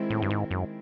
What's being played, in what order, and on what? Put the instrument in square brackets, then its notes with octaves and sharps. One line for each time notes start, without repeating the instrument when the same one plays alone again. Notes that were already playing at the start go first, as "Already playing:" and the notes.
Already playing: [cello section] D#3 G#3 C4 E4
[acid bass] A2
G2
G#2
F#2